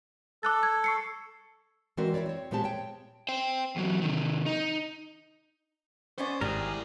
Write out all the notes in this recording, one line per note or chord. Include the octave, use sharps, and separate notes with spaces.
A4 D6 F#6 A6
G#6
C#6 C7 C#7
E3 G#3 C4 F#4 A#4 D5
E4 F#4 C#5 D5
C4 C#5
A#2 G#3 B3 C4 G4 A5
C#5 G5
C5 G5
E2 F#3
C3 D#3
D#4
B3 C#4 C5 D5
G#1 G#2 G3 E4 G#4 A#4 D5